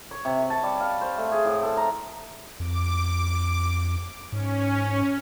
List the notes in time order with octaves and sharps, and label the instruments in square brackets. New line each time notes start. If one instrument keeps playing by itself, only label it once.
[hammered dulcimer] C#5
C3
C#5
A5
G3
F5
C5
A3
G#4
A2
A4
A#5
[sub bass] F2 [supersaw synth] D6
[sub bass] G#2 [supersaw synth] C#4